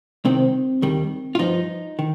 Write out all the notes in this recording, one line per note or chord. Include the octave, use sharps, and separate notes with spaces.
C2 C3 D#3 C4
D#2 D#3 G3
F4
G2 F3 D#4
D#3